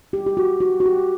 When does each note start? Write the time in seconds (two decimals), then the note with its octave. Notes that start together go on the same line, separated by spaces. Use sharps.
0.13 G4
0.26 G4
0.37 F#4
0.60 F#4
0.80 F#4
0.86 G4